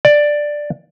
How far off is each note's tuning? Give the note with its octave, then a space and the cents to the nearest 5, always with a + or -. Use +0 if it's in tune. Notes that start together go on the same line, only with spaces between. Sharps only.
D5 +5